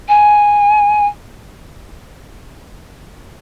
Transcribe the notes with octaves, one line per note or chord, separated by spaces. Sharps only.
G#5